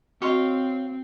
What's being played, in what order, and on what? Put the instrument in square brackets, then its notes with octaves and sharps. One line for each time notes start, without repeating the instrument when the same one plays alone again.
[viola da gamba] C4 [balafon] F#4 D#5 [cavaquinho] C#5 F5 C6